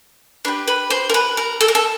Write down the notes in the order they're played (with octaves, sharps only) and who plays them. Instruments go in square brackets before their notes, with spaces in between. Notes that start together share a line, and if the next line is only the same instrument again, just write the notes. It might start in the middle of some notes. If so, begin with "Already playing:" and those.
[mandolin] D4 G4 B4
B4
C5
A#4
B4
A#4
A4
A#4
A4